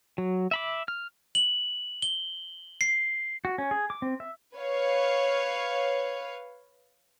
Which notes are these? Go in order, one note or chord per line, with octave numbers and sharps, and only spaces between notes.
F#3
E5 B5 D6
F6
F#7
G7
C7
F#4
C#4
G#4
D6
C4
E5
B4 C#5 F5